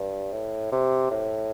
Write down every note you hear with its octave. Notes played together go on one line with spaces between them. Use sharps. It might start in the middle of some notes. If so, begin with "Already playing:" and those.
Already playing: G2
A2
C3
A2